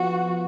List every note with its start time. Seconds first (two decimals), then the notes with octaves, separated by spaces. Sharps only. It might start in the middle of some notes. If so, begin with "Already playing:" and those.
Already playing: F3 B3 F4 F#4